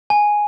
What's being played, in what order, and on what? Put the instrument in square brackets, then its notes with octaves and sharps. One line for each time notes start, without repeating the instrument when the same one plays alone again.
[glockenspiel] G#5